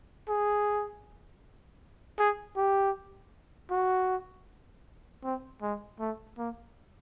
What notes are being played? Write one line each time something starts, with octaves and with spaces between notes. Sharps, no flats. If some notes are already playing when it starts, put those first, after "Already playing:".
G#4
G#4
G4
F#4
C4
G#3
A3
A#3